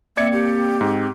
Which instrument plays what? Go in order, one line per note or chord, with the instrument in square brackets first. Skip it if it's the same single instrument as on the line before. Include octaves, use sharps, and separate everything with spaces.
[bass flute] A#3 [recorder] C4 [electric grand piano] D5 G#6 C#7 [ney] E5
[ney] G4
[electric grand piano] G#2 [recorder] C4